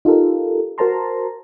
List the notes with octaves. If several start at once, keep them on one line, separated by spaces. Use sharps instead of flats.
D#4 F4 G4 A4 A#4
F#4 A#4 C5 A5 A#5 C6